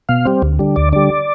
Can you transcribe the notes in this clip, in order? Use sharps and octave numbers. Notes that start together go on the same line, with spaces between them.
B2 F5
G3 C4
D2
D3 G3
D2 D5
D3 G3 D5